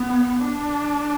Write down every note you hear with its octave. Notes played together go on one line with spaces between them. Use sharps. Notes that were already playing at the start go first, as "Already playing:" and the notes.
Already playing: B3
D4